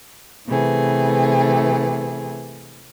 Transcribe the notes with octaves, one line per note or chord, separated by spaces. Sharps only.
C3 E3 A3 B3 G#4